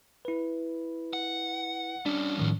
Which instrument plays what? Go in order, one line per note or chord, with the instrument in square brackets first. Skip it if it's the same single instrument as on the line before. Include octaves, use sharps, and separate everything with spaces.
[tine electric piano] E4 B4
[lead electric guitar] F#5
[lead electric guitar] G3 C#4 [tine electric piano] D4
[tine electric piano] A2 D#3 F3